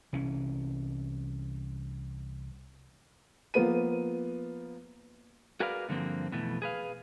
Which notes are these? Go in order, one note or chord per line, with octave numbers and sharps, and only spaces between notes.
C2 E3 C#4
F3 A#3 B3 D#7
F#4 G#4 A#4 B4 D5 F5
G2 D3 F3 A#3 C4
F2 B2 E3 A3
G#4 B4 F5